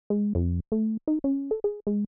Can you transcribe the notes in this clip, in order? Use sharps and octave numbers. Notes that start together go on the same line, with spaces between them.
G#3
F2
A3
D#4
C#4
A4
G#4
G#3